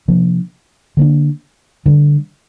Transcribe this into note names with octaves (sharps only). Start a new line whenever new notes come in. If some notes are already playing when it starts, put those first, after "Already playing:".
C3 F3 A#3 D4
D3 A#3 D4
D3 G3 D4